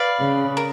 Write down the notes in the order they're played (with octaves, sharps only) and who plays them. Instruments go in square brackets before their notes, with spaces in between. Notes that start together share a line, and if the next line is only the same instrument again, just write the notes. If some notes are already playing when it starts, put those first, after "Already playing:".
Already playing: [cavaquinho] B4 D5 F5
[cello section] C#3
[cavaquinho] A#4